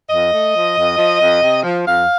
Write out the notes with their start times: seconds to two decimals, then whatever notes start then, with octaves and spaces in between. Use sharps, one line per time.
0.09 F2 D#5
0.31 A3
0.54 F3
0.76 F2
0.98 F3
1.20 F2
1.42 C3
1.63 F3
1.86 F2 F5